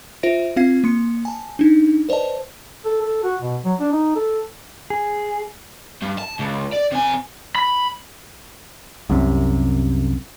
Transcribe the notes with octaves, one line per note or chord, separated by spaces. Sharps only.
F4 C5 E5 A#6 D7
C4 F4 F5 G#6 C7
A#3 C6 C#7
G#5 A5
D4 D#4
B4 C5 D5 D#5 A5
A4
A4
F#4
B2
F#3
D4
D#4
A4
G#4
G2
A5
C#2
D5
C3 G#5
B5
C2 F#2 C3